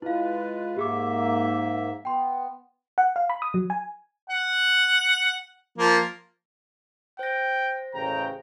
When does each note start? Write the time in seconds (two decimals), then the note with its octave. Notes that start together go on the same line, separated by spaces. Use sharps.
0.02 G#3 E4 F4 B4 F5
0.77 G#2 A#3 G4 G#4 E5 D6
2.05 B3 G5 C6
2.98 F#5
3.16 F5
3.30 B5
3.42 D#6
3.54 F#3
3.70 G#5
4.30 F#5
5.78 F3 A#3
7.19 C5 G5 A#6
7.94 A1 C#3 G5 A#5